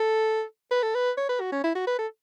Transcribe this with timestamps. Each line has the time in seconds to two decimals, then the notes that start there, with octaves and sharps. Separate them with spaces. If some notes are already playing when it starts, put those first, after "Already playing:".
Already playing: A4
0.71 B4
0.83 A4
0.95 B4
1.17 C#5
1.29 B4
1.40 F#4
1.52 C#4
1.63 E4
1.75 F#4
1.87 B4
1.99 A4